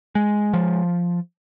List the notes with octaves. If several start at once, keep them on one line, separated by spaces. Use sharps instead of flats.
G#3
F3